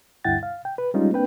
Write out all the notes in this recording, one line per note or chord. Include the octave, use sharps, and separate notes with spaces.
D2 G2 E4 F#5 G5 A6
F5
G5
B4
G3 G#3 C#4 D#4 F4
A#3 C4 D4 B4 G5